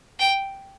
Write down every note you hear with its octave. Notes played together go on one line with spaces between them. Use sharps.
G5